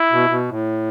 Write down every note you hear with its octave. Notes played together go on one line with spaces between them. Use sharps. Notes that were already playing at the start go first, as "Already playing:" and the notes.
Already playing: E4
B2
B2
A2